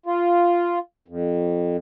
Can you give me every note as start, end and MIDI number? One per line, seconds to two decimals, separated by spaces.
0.06 0.79 65
1.08 1.77 41